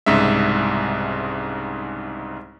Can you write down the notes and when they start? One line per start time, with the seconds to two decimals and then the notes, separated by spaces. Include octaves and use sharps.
0.06 C2 G#2 C#3 G#3 E5